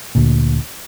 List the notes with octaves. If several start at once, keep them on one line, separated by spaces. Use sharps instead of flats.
D2 A#2